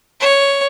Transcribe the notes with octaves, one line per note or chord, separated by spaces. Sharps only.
C#5